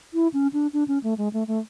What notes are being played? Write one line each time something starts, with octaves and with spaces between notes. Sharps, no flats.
E4
C#4
D4
D4
C#4
A3
G#3
A3
A3